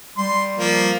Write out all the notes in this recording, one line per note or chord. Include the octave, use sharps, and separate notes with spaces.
G3 C6
F3 A#3